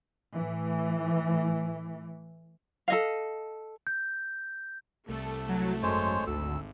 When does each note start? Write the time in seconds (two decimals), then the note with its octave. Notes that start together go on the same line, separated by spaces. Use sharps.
0.34 A2 E3
2.88 A4 D#5 F5
3.87 G6
5.09 C2 A3 A4
5.49 F#3
5.83 G#1 F#2 G#3 C5 C#5
6.27 D2 E6